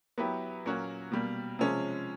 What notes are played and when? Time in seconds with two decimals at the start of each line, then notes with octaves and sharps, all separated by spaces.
0.18 F#3 B3 E4 G4 B4
0.65 A#2 F#3 A#3 C#4 F#4
1.12 B2 G3 A#3
1.59 C3 F3 G#3 C#4